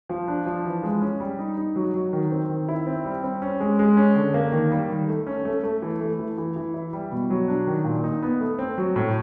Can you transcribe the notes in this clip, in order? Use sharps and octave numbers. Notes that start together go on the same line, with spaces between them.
F3
D4
F3
E3
G#3
C#4
G3
D#4
D#4
F#3
F#3
D#3
C4
D#3
E4
C4
G3
C4
C#4
G#3
G#3
C#4
D3
A#3
D#3
G3
D#3
A3
C#4
A3
A3
E3
A3
E3
E3
E3
E4
G3
B2
F#3
D4
D#3
A#2
D#4
B3
A3
C4
F#3
A2